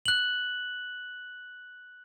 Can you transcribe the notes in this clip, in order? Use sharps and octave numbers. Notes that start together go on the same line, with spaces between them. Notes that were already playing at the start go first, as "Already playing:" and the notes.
F#6 F#7